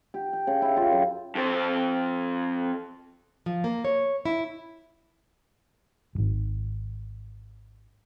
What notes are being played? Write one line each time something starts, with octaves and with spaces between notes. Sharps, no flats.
G4
G5
C#3
E4
F4
F#2
F2 C5
F3
A#3
C#5
E4
D#1 G#1